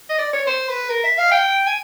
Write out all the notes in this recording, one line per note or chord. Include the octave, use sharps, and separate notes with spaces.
D#5
D5
C#5
C5
B4
A#4
E5
F5
G5
G#5